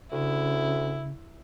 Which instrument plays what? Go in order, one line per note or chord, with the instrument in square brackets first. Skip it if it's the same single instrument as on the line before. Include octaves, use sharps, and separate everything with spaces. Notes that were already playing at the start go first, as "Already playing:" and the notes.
[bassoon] D2 [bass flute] C#3 [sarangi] E4